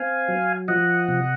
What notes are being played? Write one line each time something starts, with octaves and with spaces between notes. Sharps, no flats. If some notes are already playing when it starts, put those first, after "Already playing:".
Already playing: C4 F5 G#5
F#3
F3 D#5 F#5
C3